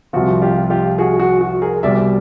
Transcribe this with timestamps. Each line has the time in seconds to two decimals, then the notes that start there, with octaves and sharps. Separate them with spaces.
0.13 C2 C3 F3 F#4
0.42 F4 G4
0.70 F4 G4
0.98 F#4 G#4
1.20 F#4
1.41 F#4
1.62 G#4 A#4
1.83 C2 B2 G3 D5 E5